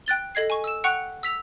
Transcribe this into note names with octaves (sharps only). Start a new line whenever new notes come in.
G5 F#6 A6 G7
A4 D#5 G#6 C7
G#5 C#6
E6 E7
F#5 G5 C#6 F#6 C#7 F7
E6 B6 F7